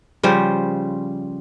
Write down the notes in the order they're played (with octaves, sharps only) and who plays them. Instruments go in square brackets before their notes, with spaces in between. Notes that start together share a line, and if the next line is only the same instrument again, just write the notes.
[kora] C#3 F3 G3 C5